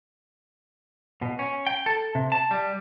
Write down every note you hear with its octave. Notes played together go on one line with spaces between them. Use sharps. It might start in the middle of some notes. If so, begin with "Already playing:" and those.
B2
C#4
G5
A4
C3
A5
G3